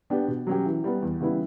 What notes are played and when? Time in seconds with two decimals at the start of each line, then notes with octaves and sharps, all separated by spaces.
0.10 B3 D4 G4
0.28 B2
0.47 F#3 C#4 G4
0.66 E3
0.84 G3 B3
1.02 E2
1.20 C#3 G3 B3 E4